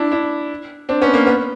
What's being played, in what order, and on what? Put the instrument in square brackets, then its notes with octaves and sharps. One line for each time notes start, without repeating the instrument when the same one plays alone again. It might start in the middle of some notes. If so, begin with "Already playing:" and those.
Already playing: [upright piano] D4 E4
D4 E4
C4 D4
B3 C#4
A#3
B3